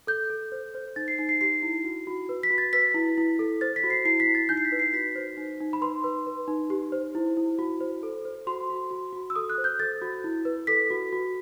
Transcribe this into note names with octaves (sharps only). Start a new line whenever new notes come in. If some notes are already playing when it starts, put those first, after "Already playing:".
A4 G6
A4
C5
C5
D#4 A6
C7
D#4 C7
C7
G4 C7
E4
F#4
F#4
B4
B6
F#4
A6
B4 B6
E4
E4
A4
C5 A6
B6
F#4
C7
E4 C7
B6
E4
A6
D#4 G6
C7
B6
B4
C7
F#4 B6
C5
D#4
D#4
B5
B4 C6
B4
B4
D#4
G4
C5
E4
E4
F#4
C5
A4
C5
F#4 C6
F#4
F#4
F#4
E6
A4 D#6
F#6
C5
G6
A4 A6
F#4
E4
B4
A4 B6
F#4
F#4